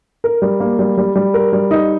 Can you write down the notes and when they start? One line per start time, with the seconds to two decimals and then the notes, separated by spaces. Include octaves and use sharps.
0.24 A#4
0.42 G3
0.60 A#3
0.79 G3
0.98 G3
1.16 G3
1.34 A#4
1.53 G3
1.71 D#4